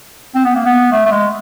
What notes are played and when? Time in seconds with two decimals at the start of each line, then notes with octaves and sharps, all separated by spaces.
0.35 C4
0.45 B3
0.55 A#3
0.65 B3
0.92 A3
1.06 A3
1.11 G#3